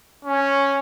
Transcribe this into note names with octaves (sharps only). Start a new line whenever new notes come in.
C#4